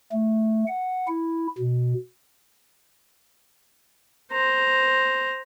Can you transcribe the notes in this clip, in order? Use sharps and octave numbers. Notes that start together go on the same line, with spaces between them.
A3
F#5
E4
B2
C5 A#5